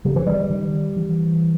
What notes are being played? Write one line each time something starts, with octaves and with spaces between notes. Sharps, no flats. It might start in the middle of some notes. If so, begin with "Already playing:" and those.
C#3 G3
E3
G3
D#3
E3